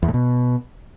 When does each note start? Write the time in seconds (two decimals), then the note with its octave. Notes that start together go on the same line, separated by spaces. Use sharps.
0.03 E2
0.08 A2
0.14 B2